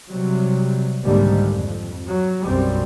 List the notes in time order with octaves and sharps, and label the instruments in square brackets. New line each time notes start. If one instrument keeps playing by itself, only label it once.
[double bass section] C3 F#3 G3
C2 G#2 D3 D#3 G3 A#3
F2
F#3
B1 F#2 G3 C4